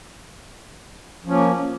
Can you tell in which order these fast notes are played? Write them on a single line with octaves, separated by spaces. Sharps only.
F3 C#4 A#3